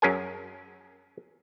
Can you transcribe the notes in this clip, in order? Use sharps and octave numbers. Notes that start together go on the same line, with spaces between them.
F#2 C#4 G#4 A#4 G#5